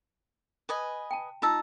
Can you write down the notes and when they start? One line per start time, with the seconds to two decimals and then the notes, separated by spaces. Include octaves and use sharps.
0.69 B4 D#5 G#5
1.11 G5 A5
1.42 D#4 F4 A5 A#5 E6